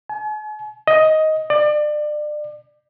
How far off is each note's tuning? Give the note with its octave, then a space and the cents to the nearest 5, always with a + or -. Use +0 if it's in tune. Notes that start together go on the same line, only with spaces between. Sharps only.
G#5 +45
D#5 +10
D5 +30